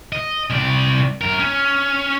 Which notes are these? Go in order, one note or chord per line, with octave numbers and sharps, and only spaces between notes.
D#5
C2 D5
F#2 A#4
C#4